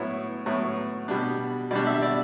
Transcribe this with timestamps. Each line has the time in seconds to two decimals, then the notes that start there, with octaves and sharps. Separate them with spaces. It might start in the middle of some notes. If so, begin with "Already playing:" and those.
Already playing: A2 F#3 B3 E4 C#5
0.46 A2 F#3 B3 E4
1.08 B2 G3 D4
1.71 B2 G3 D4 D5
1.87 E5
2.02 D5